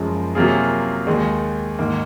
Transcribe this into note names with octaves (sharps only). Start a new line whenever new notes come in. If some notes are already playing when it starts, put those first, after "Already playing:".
Already playing: F#1 F#2 F3 G#3
C3 F#3 A#3 F4 G#4
D#2 D#3 G#3
G#2 D#3 A#3